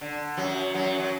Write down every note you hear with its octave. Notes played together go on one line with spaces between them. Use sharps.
D3
F#2 F#3
F#2 F#3
F#3